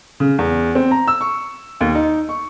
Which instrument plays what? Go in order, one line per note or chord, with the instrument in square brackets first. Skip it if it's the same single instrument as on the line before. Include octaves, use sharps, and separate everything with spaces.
[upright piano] C#3
E2
C4
A#5
E6
C#6
D#2
D#4
C#6